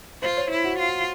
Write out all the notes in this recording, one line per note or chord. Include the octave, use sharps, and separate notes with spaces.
F4 C5
C#5
E4
F#4
F4